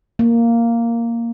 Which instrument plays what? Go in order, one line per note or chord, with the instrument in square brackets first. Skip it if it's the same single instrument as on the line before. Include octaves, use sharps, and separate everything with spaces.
[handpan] A#3